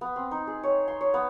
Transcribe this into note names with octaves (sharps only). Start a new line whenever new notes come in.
B3
C4
D#4
G#4
C#5
C6
C#5
B3